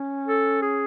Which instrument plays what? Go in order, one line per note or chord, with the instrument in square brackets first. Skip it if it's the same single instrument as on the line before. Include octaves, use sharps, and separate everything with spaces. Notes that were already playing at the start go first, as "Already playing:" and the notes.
Already playing: [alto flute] C#4
[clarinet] A4
G#4